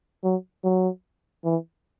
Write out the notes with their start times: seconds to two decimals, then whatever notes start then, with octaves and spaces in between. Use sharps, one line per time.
0.24 F#3
0.64 F#3
1.44 E3